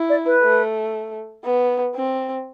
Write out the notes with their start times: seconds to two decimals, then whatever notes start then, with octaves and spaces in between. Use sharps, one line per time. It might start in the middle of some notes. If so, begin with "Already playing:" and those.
Already playing: E4
0.09 D5
0.26 B4
0.43 A3
1.44 B3
1.96 C4